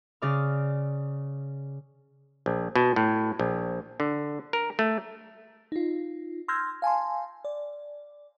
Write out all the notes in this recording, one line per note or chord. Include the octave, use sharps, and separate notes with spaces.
C#3 D5 F6
A#1
B2
A2
A#1
D3
A#4
A3
D#4 F4
C6 E6 F6 G6 G#6 A#6
F5 G#5 A5 C6
D5